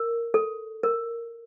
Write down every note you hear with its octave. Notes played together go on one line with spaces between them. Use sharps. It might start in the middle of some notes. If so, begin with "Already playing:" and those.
Already playing: A#4
A4
A#4